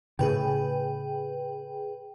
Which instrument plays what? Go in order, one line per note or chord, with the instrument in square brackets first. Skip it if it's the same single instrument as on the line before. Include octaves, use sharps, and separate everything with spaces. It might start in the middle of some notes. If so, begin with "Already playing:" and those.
[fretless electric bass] A2 C#3 [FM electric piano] G#4 B4 G5